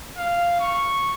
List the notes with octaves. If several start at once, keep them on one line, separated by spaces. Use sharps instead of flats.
F5
C#6